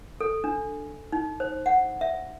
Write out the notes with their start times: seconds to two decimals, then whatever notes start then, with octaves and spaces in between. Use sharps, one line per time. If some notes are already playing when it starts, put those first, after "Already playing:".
0.21 A4
0.44 D4
1.12 D#4
1.40 C5
1.66 F#5
2.01 E5